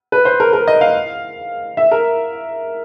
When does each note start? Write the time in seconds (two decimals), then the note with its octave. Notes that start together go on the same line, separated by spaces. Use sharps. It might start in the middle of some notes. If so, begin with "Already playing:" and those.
0.12 B4
0.25 C5
0.40 A#4
0.53 A#4
0.68 D#5
0.81 F5
1.77 E5
1.91 A#4